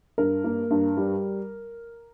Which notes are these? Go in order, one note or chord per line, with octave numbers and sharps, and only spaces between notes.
G2 A#4
A#3
G2
G3